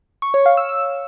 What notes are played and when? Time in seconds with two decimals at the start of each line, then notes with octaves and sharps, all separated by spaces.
0.22 C#6
0.34 C#5
0.46 F5
0.57 E6
0.69 E6